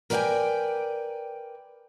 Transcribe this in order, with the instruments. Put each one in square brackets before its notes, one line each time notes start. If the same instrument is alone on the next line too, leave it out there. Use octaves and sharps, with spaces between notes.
[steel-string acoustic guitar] A#4 B4 D5 E5 G5 G#5